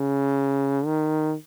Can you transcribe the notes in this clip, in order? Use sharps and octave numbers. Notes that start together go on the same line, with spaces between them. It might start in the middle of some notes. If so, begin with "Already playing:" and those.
Already playing: C#3
D#3